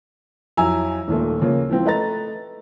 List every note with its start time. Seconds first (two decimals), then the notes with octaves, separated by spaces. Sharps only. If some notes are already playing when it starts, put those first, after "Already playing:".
0.57 F2 F#3 E4 G#5 A#5 E6
1.08 D#1 A#2 A3
1.42 C#3 F3 A#3
1.69 E3 F3 C4
1.86 A3 B4 D#5 A#5 A6